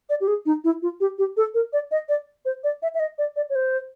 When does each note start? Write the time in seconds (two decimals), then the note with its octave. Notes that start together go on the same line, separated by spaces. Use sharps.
0.10 D5
0.21 G4
0.28 G#4
0.46 D#4
0.64 E4
0.82 F4
1.00 G4
1.19 G4
1.37 A4
1.54 A#4
1.73 D5
1.91 D#5
2.09 D5
2.45 C5
2.64 D5
2.82 E5
2.94 E5
3.00 D#5
3.18 D5
3.36 D5
3.50 C#5
3.55 C5